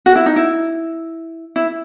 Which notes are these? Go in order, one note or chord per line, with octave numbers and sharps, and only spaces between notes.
F#4
E4
D#4
E4
E4